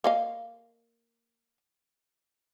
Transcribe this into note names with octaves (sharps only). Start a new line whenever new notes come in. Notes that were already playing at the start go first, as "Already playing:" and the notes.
A#3 D#5 F5